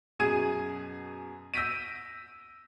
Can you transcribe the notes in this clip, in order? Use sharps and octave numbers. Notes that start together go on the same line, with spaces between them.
F#2 B2 G#4 D#6 G#6 D#7
E6 G6 A#6 B6 D7 D#7